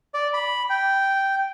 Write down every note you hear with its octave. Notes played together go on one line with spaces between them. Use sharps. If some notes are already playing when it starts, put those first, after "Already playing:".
D5
B5
G5